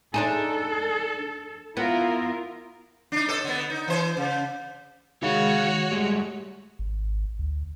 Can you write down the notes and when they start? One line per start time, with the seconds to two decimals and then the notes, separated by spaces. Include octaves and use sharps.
0.14 D4 D#4 G#4 A4
1.77 B3 E4 F4 A#4
3.12 D4 D#4
3.27 A2 A4 D#5
3.44 D3 B3
3.70 D#4
3.88 E3 C5
4.17 C#3
5.22 D#3 G#3 F#4 G#4 C#5 F5
5.92 A2 G3 G#3
6.79 G#1
7.39 D2